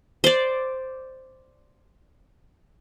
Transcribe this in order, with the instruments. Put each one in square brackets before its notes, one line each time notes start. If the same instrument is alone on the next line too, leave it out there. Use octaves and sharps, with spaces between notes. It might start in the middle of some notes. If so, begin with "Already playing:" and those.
[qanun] C5 D5